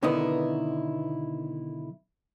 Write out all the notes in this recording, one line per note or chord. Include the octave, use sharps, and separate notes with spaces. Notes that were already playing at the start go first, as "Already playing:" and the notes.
B1 D3 D#3 B3 D#4 E4